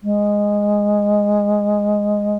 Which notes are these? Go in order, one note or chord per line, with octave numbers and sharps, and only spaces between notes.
G#3